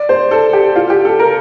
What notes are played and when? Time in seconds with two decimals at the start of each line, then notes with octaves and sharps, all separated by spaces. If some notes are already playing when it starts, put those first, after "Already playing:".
Already playing: D5
0.09 C5
0.31 A4
0.53 G4
0.76 F4
0.90 G4
1.05 A4
1.19 A#4